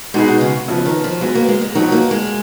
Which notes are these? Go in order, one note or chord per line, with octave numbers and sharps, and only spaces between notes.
B2 G#3 D#4 G#4 B4
B2
C#3
C#3 F3 B3
D#3
F3
F#3 G#3 B3 F#4
A#3
G#3
G#3
F3 F#3 B3 D#4 A#4
A#3
G#3